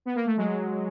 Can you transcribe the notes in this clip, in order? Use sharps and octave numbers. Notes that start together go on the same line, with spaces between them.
B3
A#3
A3
F#3 G#3